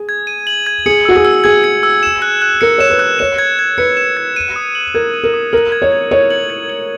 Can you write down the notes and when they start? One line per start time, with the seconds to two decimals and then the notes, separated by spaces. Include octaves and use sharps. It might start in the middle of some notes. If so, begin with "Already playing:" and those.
Already playing: G#4
0.09 G#6
0.27 D#7
0.47 F#7
0.66 G#6
0.86 G#4 C#7
1.05 F#4 E6
1.16 G#4
1.25 E6
1.44 G#4 G#6
1.64 C#7
1.83 E6
2.03 E7
2.22 F#6
2.42 F#6
2.61 A#4 C#7
2.78 C#5 E7
2.90 B4
2.99 F#6
3.19 C#5 E7
3.38 G#6
3.59 G#6
3.78 B4 C#7
3.97 E7
4.17 G#6
4.36 D#7
4.56 D#6
4.75 F#7
4.94 A#4 G#6
5.14 D#7
5.24 A#4
5.34 D#6
5.53 A#4 F#7
5.72 G#6
5.82 C#5
5.92 G#6
6.11 C#5 D#7
6.30 F#7
6.50 G#6
6.70 F#7